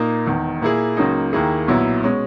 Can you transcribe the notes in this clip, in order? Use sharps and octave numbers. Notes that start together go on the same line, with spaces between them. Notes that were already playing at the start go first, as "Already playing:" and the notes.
Already playing: A#2 A#3 D#4
E1 E2 D#3
A#2 A#3 E4 G#4
C#2 C#3 F#3 A#3 D#4
D#2 D#3 A#3 E4 G#4
B1 A#2 F#3 B3 E4
B2 G#3 C#4